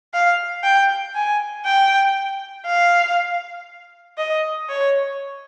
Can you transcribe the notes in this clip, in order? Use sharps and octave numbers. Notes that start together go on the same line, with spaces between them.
F5
G5
G#5
G5
F5
D#5
C#5